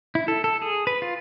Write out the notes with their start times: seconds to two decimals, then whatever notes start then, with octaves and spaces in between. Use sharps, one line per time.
0.15 E4
0.28 A4
0.44 A4
0.62 G#4
0.87 B4
1.02 F4